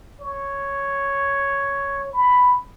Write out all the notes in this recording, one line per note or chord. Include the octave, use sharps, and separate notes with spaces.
C#5
B5